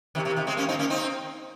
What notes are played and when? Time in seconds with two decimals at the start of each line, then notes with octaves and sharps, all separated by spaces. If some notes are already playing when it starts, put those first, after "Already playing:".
0.15 C3 D#3
0.25 C3 D#3
0.36 C3 D#3
0.47 G#3 C4
0.57 A#3 C#4
0.69 C4 D#4
0.79 A#3 C#4
0.90 C4 D#4